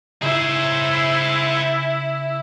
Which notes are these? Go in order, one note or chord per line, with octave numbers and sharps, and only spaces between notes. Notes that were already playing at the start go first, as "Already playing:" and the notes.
C#3 E4 G#4 C5